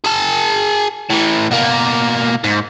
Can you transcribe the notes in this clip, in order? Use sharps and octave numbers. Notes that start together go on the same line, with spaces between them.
G#4 A5
A2 E3
B2 A#3
G#2